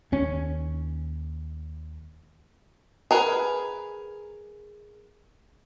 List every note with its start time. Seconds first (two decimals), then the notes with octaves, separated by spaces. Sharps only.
0.12 D#2 C#4
3.11 G#4 A#4 B4